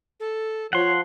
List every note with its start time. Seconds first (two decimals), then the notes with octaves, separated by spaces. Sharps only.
0.20 A4
0.73 F3 C#5 F#5 C6